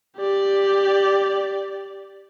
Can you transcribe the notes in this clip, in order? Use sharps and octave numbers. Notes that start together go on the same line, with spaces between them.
G4 D5